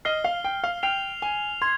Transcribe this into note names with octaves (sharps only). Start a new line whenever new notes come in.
D#5 F6 C7 G7
F5
G5
F5
G5 F6 C7 F7
G#5
C6 G#6